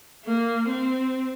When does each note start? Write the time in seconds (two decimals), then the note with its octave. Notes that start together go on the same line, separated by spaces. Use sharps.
0.25 A#3
0.68 C4